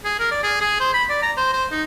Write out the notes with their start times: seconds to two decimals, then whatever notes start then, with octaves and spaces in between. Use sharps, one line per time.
0.05 G#4
0.20 A#4
0.31 D5
0.43 G#4
0.61 G#4
0.80 C5
0.94 B5
1.09 D5
1.23 A#5
1.37 C5
1.53 C5
1.71 D#4